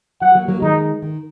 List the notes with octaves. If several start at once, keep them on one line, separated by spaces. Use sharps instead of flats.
F#3 F#5
F#3 A#3
F#3 A#3
D#3 G#3 D#4
D#3